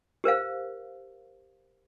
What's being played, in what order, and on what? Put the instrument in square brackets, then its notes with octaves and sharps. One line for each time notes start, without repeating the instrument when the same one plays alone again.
[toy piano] G4 A#4 C5 F5